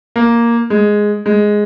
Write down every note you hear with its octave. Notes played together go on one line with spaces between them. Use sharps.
A#3
G#3
G#3